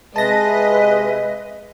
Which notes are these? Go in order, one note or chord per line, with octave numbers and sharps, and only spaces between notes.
C3 G#3 B4 D#5 E5 A5 A#6